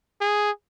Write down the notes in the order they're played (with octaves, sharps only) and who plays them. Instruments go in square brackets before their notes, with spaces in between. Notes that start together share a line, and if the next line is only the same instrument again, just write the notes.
[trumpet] G#4